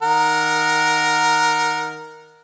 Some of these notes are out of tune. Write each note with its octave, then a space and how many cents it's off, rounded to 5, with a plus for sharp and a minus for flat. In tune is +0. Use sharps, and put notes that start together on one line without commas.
D#3 +0 A#4 +0 F#5 -25